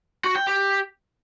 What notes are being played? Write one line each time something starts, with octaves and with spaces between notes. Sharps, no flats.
F#4
G5
G4